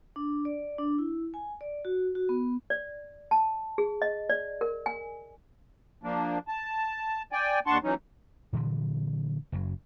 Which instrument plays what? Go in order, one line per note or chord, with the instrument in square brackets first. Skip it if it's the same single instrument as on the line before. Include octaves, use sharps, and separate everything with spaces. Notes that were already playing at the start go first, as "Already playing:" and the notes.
[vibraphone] D4
D5
D4
E4
G#5
D5
F#4
F#4
B3
[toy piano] D5
A5
G#4
D#5
D5
A#4
G#5
[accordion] F3 A#3 D4
A5
D5 G5 G#5
D#2 D4 F#5 A5 C6 C#6
E3 F#3 C#4 D#4
[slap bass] A#2 D3 E3 F#3
F#1 F#2 F#3